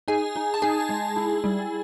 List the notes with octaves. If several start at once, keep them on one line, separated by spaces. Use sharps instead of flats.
D#4 G#4 G#5
D#4
A5
D#4 G#4 G#5
G#3
E4
G3